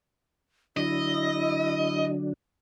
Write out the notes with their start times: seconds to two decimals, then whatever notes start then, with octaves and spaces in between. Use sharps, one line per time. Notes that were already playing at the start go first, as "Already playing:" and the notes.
0.77 D3 F#3 D4 E4 D#5